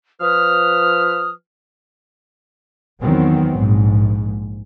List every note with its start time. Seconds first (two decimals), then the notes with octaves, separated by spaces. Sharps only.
0.21 F3 B4 D#6 F6
3.02 E2 D#3 F#3 B3 C4
3.59 A#1 G#2